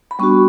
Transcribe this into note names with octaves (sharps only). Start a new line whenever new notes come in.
B5
G3 B3 D4 F#4 C#6